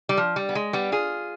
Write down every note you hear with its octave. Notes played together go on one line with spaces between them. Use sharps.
G3
F3
G3
B3
G#3
G3 B3
F4 G#4